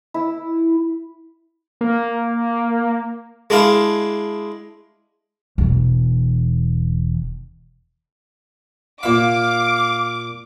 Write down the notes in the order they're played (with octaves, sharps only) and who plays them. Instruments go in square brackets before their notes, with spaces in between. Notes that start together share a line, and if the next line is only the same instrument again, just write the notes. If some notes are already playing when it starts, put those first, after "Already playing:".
[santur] E4
[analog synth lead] A#3
[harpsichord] G#3 D4 E4 F5
[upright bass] E1 E3
[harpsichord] A#2 E5 [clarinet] F5 [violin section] D6